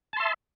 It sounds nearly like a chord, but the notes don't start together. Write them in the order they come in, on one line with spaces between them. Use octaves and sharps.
A5 C6 E5